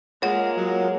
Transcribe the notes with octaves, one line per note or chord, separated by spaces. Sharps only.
G#3 A#3 F4 G#4 A#4 C#5 F#5
F#3